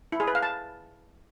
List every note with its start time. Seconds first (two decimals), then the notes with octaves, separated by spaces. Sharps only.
0.12 E4
0.20 G#4
0.27 B4
0.35 F5
0.43 A5